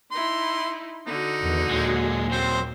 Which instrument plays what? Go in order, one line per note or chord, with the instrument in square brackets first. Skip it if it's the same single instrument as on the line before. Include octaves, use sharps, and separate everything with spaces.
[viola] D#4 E4 [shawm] C6
[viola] D3 F#4 [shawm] D#4
[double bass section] E2 D#3
[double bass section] D#2 A#2 A#3 [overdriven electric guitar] F#3 G#3
[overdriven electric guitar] F#3 C4 [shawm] C5